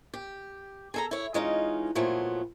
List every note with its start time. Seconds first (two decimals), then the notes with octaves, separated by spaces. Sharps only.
0.14 G4
0.94 G#4 A4 A#5
1.11 E4 C#5
1.34 E3 G#3 C#4 D#4 F4
1.95 A#2 F3 F#3 A3 B3